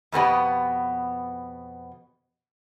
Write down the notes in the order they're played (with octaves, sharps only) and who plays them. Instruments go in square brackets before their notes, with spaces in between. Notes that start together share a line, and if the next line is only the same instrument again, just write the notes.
[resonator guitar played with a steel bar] F2 B2 B3 G4